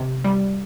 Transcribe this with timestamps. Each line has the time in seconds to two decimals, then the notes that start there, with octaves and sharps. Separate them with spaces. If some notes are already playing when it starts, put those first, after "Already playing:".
Already playing: C3
0.24 G3